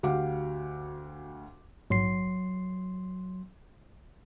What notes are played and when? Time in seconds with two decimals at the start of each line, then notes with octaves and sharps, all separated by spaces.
0.03 D2 F#4 G4 F5 F#5 D6
1.90 A#1 G#2 F#3 C6 C7